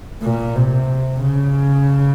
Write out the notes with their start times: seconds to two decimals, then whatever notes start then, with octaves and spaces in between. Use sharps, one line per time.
0.22 A#2
0.55 C3
1.22 C#3